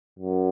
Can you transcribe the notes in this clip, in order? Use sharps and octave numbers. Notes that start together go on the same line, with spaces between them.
F#2